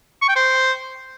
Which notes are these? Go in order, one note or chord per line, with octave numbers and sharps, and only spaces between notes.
C#6
G5
C5